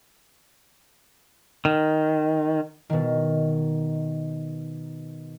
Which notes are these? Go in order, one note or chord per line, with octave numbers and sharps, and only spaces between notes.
D#3
B2 D#3